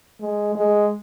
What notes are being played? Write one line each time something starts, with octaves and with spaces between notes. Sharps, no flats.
G#3
G#3